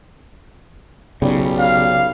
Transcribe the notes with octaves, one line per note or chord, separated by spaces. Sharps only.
B1 C#3 G3
F5